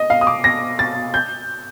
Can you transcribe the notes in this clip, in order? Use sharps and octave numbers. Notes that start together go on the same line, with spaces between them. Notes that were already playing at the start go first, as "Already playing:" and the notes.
Already playing: D#5
F5
D#6
D6
A#6
A6
G6